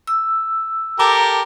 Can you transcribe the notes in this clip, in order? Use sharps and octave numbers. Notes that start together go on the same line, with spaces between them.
E6
G4 A4 A#4 A#5 D6